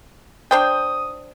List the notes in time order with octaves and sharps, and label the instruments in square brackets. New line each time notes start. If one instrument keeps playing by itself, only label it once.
[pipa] D4 C5 G5 [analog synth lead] D#6